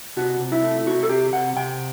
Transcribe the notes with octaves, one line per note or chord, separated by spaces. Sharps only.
C3 F#4
C3
E4
A3
C3 F#4
A4
C3 G4
C3 F#5
C3 G5